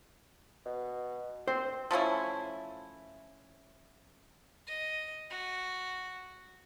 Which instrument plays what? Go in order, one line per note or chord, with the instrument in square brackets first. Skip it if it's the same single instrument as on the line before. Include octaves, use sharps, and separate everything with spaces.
[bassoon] B2
[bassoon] C4 [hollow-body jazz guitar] C5
[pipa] F3 A3 C#4 E4
[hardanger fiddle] D#5
F#4